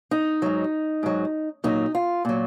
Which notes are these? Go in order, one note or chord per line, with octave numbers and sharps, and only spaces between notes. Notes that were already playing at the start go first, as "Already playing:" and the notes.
D#4
G#2 F#3
G#2 F#3
A#2 F#3 D#4
F4
A#2 F#3